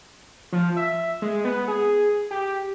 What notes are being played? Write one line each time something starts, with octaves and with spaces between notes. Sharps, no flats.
F3
E5
G#3
B3
G#4
G4